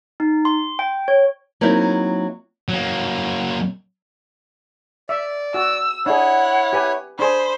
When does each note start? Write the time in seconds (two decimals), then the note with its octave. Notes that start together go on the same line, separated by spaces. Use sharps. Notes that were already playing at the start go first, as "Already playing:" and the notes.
0.20 D#4
0.45 C6
0.79 G5
1.08 C#5
1.61 F#3 A#3 C4 D#4 E4
2.69 F#3 A#3
5.09 D5 E5
5.54 F#4 E6
6.06 D4 E4 G#4 C#5 F#5
6.73 G4 B4 G#5
7.19 D4 G#4 C5 B5